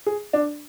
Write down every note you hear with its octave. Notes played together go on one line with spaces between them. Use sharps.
G#4
D4